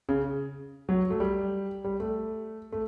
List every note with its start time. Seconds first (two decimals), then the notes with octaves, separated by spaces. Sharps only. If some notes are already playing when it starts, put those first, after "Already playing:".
0.09 C#3
0.89 F#3
1.10 A3
1.20 G3
1.85 G3
2.00 A3
2.72 A3